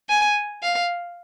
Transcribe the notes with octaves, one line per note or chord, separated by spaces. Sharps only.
G#5
F5